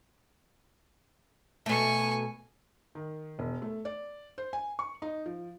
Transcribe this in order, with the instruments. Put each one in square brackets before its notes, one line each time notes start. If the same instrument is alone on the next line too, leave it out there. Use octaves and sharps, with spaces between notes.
[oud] B2 A3 [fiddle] G#5 C#6
[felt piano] D#3
E1
A3
D5
C5
G#5
C#6
D#4
F3